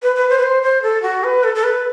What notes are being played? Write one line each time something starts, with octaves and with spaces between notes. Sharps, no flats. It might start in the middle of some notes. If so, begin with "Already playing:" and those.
B4
B4
C5
B4
C5
C5
A4
F#4
B4
A4
A4
B4